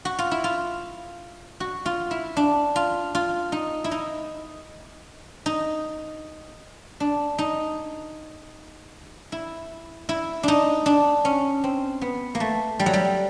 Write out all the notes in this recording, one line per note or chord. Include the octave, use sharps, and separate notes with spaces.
F#4
F4
E4
F4
F#4
F4
E4
D4
F4
F4
D#4
E4
D#4
D#4
D4
D#4
E4
E4
D4 D#4
D4
C#4
C4
B3
A#3
A3
G3
F#3
G3